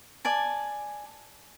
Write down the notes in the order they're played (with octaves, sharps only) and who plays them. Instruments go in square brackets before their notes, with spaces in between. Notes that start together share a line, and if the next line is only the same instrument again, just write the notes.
[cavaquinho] D5 G#5 A5